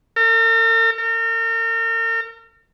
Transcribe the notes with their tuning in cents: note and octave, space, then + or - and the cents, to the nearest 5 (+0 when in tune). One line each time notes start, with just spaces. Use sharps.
A#4 -45
A#4 -40